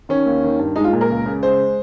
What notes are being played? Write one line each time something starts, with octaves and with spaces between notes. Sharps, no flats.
D#3 C#4
D#2
D#3
G2
G#3 D#4
F4
A#2
A#4
C#2
C#3
G#3 C5